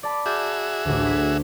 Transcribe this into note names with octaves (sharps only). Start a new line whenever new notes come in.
D5 A5 B5
F#4 G#4 E5 G6 A6
A1 D2
G#6 A#6 B6